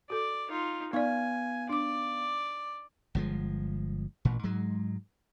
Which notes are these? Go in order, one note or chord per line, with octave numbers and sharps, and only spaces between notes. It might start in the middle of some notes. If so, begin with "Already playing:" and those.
F#4 A4 D5
D#4 F4
B3 D#4 D5 F5 G#5
D4 D5 D6
G1 F3 G#3
A1 A#2
G#2 F#3 G#3